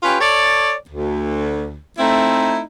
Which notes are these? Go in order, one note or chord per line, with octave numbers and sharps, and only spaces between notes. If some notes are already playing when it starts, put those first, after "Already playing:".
C#4 F4 G4 B4
A4 C#5 D5
D2
A3 C4 D#4 E4